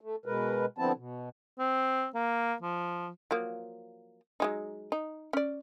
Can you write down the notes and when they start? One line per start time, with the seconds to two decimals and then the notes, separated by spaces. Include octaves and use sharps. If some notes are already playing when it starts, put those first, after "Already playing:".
0.01 A3
0.26 B2 G#3 A#4 B4
0.78 D3 F3 B3 C4 E4 A5
0.96 B2
1.59 C4
2.15 A#3
2.62 F3
3.31 F3 F#3 A#3
4.40 F#3 G#3 D#4
4.92 D#4
5.33 C#4 D5